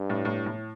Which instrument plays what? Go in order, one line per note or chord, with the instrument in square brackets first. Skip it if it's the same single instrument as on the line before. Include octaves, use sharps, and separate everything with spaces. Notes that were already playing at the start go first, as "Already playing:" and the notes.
Already playing: [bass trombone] G2
[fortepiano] A2
A2
A2